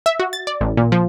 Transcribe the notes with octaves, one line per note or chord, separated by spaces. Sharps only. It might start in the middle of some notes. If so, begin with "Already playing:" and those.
E5
F#4
A6
D5
A1
A#2
F3